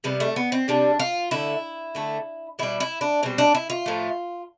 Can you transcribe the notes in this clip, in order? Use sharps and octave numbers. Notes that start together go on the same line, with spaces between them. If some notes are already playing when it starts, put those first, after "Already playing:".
C3 G3 B3
A3
B3
C4
C3 G3 D4
F4
D3 A3 E4
D3 A3
B2 G3 E4
E4
D4
B2 G3 C4
D4
E4
F4
A2 F3 A3